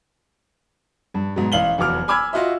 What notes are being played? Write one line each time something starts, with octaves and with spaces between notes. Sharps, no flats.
G2
G#2 B2 F#3
A1 F5 F#7 G7
F1 E2 F#3 D6 F6
G#5 B5 D6 E6 F6 G#6
F4 F#4 D#5 E5